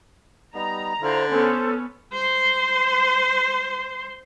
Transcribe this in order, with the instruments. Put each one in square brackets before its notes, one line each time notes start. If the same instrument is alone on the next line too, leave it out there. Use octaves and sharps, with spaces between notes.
[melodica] G3 B3 D#4 [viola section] A#5
[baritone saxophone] D3 [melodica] E4 F4 [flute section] C5
[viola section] B3 C#4 [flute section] A4 [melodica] C5
[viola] C5 C6